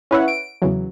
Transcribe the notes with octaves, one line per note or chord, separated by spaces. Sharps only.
C#4 E4 B4 C#5 E5 F#5
D7
E2 C#3 E3 F#3